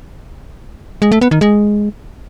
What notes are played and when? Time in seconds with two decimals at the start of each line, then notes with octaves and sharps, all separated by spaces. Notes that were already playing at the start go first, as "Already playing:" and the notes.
1.02 G#3
1.12 A3
1.21 B3
1.31 D#3
1.41 G#3